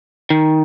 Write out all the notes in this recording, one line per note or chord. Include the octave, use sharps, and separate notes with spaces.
D#3